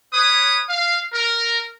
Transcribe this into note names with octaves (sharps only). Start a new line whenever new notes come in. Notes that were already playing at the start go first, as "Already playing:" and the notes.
C#4 B4 C#5 D#6
F5
A#4